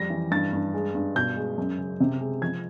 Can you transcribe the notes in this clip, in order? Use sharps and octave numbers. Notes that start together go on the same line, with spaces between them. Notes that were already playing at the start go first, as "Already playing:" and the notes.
Already playing: F2 G3 A#6
E3
G2 A6
G2
G#3
G2
B2 G6
G#3
F#2
C#3
C3
G#3
F3 G#6